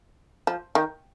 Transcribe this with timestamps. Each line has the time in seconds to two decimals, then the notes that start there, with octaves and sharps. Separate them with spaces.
0.47 F3
0.75 D#3